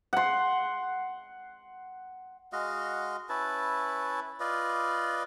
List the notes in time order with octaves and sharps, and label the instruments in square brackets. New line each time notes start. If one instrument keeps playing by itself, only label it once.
[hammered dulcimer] F#5 C6
[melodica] G#3 F#4 D#5 F5
C#4 E4 B4 A5
F4 B4 D5 D#5